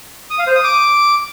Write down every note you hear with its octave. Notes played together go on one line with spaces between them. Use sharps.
D#6
F5
C5
D#6
D6